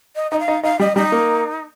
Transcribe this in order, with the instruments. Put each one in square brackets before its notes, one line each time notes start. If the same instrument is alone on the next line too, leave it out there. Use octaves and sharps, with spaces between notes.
[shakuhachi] D#5
[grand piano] D#4 [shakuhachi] D#5
[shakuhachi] F5
[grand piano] D#4
[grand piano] D#4 [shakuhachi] F5
[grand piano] G3 [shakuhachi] D#5
[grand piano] G3 [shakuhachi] D#4
[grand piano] A#3